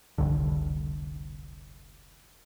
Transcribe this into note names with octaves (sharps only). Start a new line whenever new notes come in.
F1 C2 G2 D3